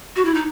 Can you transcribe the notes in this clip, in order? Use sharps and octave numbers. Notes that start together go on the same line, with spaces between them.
F#4
E4
D#4